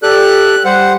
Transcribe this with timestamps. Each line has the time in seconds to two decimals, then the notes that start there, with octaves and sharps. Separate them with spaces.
0.03 G4 A4 D5 F#6
0.65 G3 C5 F#5